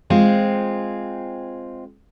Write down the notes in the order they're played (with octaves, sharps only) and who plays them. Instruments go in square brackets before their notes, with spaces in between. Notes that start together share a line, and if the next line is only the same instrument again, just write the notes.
[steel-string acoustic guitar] G#3 C4 F4